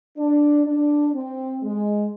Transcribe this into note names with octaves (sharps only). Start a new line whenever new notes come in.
D4
D4
C4
G#3